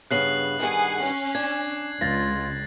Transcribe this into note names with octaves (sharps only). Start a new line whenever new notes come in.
G2 C#3 B3 F#6 C7 F#7
G2 D#3 G#4 F#5
C#4
D4 G#6
C#2 F4 A6 A#6